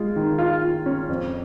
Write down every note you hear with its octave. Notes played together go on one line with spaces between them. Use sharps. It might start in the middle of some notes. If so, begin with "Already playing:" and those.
Already playing: G#3 F4
D#3
F4
F4
C#4
F2